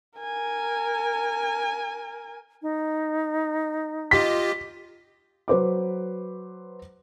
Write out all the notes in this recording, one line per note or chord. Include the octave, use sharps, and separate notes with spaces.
A#4 G#5
D#4
F4 G4 D#5 B6
F#3 B4 C5 D6